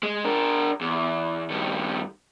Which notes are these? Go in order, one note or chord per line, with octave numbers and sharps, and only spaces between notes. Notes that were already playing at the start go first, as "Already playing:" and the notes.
G#3
D4 A#4
E2
G2 D#3